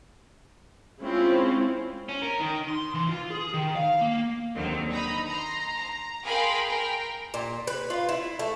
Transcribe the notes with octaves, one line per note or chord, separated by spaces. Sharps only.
G#3 C4 C#4 E4 F4
C#4
A#4
D#3
C6
E3
F4
G#4
D#3
F5
A#3
D#2 D3 D#3 F#3 C4
D#4 A#5 B5
A#5 C6
A#5
G#4 A#4 F5 G5 B5 C6
A#4 G5
A#2
B4
F4
E4
A3